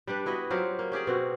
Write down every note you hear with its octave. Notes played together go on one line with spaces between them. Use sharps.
G3 D4 G4 B4
B3 E4 F#4 D#5
F#3 C4 F4 G4
A#3
C#4 G4 G#4 D5
B2 C4 F#4